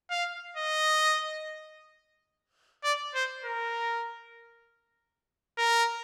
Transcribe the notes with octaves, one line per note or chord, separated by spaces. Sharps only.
F5
D#5
D5
C5
A#4
A#4